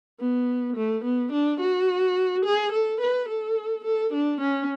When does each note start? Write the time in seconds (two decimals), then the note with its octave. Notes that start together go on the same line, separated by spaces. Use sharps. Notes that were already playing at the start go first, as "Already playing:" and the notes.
0.20 B3
0.77 A3
1.04 B3
1.32 D4
1.60 F#4
2.45 G#4
2.72 A4
3.01 B4
3.29 A4
3.85 A4
4.13 D4
4.41 C#4